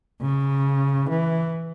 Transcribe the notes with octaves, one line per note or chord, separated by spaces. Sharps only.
C#3
E3